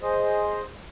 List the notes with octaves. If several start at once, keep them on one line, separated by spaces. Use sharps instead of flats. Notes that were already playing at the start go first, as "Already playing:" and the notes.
G#4 C5 D#5